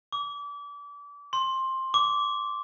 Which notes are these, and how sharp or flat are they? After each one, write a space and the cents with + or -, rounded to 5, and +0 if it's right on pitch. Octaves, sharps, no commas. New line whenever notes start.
D6 -30
C6 +15
D6 -20